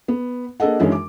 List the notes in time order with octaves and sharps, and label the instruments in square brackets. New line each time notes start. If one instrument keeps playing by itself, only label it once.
[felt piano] B3
A#3 D4 G#4 A4 D#5 F#5
F#2 D#3 E3 G#3 C#4 D4
D6